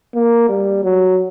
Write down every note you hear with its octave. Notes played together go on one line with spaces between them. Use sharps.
A#3
G3
F#3